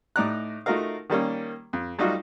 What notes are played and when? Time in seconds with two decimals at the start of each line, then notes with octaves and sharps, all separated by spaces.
0.16 A2 D#4 D5 A#5 F#6
0.66 A3 D#4 F4 F#4 A#4 F5
1.10 D#3 G3 A#3 C#4
1.73 F2
1.99 F#3 G3 A3 D#4 F4 F#4